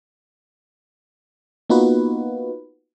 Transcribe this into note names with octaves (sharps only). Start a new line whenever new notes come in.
A#3 B3 D#4 F4 F#4 B4